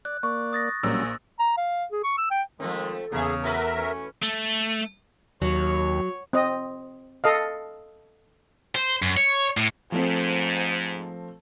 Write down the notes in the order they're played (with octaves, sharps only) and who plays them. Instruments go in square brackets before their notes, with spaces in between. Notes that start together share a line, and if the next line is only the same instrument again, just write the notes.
[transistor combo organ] D5 [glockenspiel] F#6
[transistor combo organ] A#3 D5 [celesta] C#6
[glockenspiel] D#6 A6 A#6
[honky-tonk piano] A#1 A#3 E6 [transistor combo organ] F#3 G3 C#4
[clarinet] A#5
F5
G#4
C#6
E6
G5
[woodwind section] D#3 G#3 [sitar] F3 A3 C4
[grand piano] E2 [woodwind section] C#3 [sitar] A#3 E5 [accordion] G#4
[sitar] A3 F#4 B4 [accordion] A#4 E5
[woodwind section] E3 C#4
[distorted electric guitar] A3
[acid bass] D#2 [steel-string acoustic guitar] F#3 [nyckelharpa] C#5
[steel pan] C4 D#5
A4 D#5 F5
[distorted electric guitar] C5
F#2
C#5
A2
[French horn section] G#2 [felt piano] F3 A3 C4